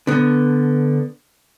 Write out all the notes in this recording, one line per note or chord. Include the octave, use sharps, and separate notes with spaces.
D3 B3